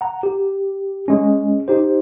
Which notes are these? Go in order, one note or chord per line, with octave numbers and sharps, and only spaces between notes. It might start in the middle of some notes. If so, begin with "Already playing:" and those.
F#5 A#5
G4
G#3 C#4
D#4 G4 C5